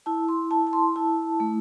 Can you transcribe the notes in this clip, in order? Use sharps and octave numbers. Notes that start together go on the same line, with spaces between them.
E4 A5
C6
E4 A5
A5
C6
E4 A5
A3